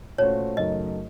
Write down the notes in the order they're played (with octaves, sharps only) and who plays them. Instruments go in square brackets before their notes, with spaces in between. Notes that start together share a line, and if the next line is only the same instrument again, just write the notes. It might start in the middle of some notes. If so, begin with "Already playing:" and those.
[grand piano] A#2 A3 C#4 F#4 C5 [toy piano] C#5
[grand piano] F#2 C#3 A3 D#4 A#4 [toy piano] D#5